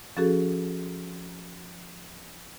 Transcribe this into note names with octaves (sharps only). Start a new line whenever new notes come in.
F3 C#4 F#4 G#4 A4